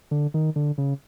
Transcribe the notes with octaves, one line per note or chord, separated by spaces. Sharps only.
D3
D#3
D3
C#3